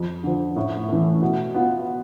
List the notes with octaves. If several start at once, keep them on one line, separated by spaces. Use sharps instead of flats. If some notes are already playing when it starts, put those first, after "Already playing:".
Already playing: F2
D3 F3
A2
E3 A3
B2
B3 F4